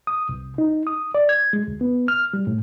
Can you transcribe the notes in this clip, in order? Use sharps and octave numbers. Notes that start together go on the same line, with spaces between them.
D#6
C2
D#4
D#6
D5
G#6
G#3
D2
B3
F6
G3
A2